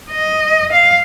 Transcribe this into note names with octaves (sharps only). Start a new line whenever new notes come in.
D#5
F5